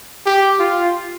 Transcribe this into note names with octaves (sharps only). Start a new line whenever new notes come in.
G4
F4